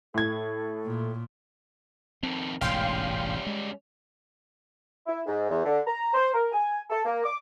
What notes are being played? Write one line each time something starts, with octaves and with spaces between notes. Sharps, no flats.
A2 A4 G#6
A#2
F2 D#3 C4
E1 A1 G#2 G3 C#4 F5 G5 C6
G#3
E4
G#2
E2
D3
A#5
C5
A#4
G#5
A4
A#3
D6